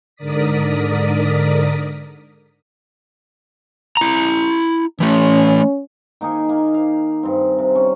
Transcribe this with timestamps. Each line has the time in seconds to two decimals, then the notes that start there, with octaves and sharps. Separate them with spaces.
0.16 G#2 D3 A#4 D5 D#6 B6
3.97 E4 A#5
5.00 E3 A3 C#4
6.21 D#3 A#3 D#4 G#4
6.49 A#3
6.74 F5
7.23 G2 C4
7.58 C3
7.75 C#4